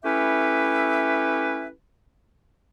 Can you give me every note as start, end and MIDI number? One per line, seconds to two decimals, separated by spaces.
0.05 1.70 57
0.05 1.70 61
0.05 1.70 64
0.05 1.70 67
0.05 1.70 71
0.05 1.70 76